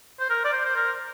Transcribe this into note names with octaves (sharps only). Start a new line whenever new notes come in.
C5
A#4
D5
C5
C5
A#4